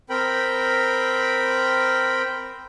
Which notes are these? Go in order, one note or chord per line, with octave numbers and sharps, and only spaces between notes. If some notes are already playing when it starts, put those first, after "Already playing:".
C4 A#4 G5 B5